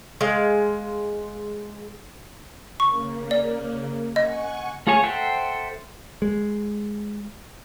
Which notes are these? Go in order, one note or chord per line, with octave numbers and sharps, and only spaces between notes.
G#3 F5
C#3 A#3 C#6
D5
D#5 F#5 G#5 C#6
A3 F4 G#4 C#5 G#5
A4 C5 E5 F#5 G5
G#3